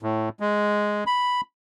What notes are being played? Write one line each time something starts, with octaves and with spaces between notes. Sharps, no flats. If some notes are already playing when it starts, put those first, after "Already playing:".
A2
G#3
B5